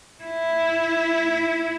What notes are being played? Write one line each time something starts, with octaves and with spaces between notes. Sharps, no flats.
E4